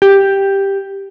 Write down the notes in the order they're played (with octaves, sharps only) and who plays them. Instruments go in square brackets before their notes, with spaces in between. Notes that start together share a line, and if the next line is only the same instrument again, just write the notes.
[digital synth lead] G4